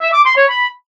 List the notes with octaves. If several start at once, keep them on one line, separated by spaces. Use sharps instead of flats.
E5
D6
C6
C#5
B5